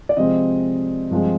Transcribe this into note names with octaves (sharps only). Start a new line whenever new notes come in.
D5
C3 F3 G#3 C4 D#5
G2 F3 G#3 C4